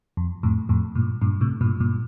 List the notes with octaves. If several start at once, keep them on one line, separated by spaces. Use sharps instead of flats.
F2
F2 A2
F2 A2
G2 A#2
G2 A#2
A2 C3
G2 A#2
G2 A#2